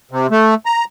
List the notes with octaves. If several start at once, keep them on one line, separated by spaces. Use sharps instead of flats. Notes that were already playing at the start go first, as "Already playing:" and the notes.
C3
A3
A#5